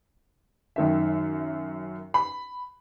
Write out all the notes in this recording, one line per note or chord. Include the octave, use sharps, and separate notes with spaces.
F#2 D#3 E5
B5